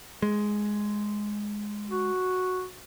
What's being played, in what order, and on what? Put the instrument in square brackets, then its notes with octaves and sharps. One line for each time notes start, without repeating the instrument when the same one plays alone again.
[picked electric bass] G#3
[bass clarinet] F#4